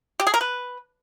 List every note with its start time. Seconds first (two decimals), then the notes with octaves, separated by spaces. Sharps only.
0.20 G4
0.27 G#4
0.34 A#4
0.41 B4